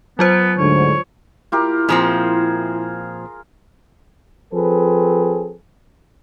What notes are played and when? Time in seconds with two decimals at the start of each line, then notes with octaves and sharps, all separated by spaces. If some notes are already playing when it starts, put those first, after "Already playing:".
0.19 F#3 B3 F4 C5
0.58 D2 G#2 D3 C#5
1.52 E4 F4 G4 A#4
1.89 A#2 F3 C4 G#4 A#4
4.53 F3 C4 G#4 A4 B4